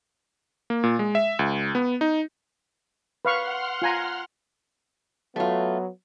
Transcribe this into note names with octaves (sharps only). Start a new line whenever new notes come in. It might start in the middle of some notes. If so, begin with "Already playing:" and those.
A#3
A#2
G#3
E5
C#2
B3
D#4
B4 F5 F#5 C6 C#6 F6
F4 G#5 A#5
F#3 A3 B3 F4